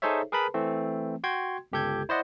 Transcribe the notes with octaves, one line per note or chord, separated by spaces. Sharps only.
D#4 G#4 A4 C5 C#5 E5
G#4 A#4 B4 A5 B5
E3 A3 C4
F#4 G5 C6 G#6
G1 C#2 G4 A4 G6 G#6
E4 C5 D5 D#5 F#5